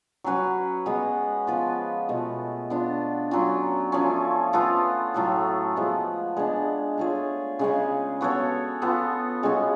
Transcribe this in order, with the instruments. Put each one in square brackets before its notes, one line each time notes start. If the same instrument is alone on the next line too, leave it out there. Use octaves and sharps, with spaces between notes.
[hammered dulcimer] F#3 C#4 F#4 B4
G#3 B3 F#4
F3 B3 F4 B4
B2 A3 F4
B3 D4 F4
F#3 C#4 F4
F3 A3 C#4
B3 F4 A4
A2 F#3 A3 F4
F3 G#3 B3
G#3 B3 D4
A3 F4 G#4 C#5
C#3 G#3 C#4
B3 F#4 A4 C#5
B3 F4 A4
C#3 G#3 C#4 F#4